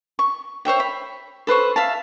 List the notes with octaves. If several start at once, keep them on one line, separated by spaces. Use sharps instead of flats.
C#6
C5 C#5 E5 G5
B5
A4 B4 C5 C#6
E5 F5 A5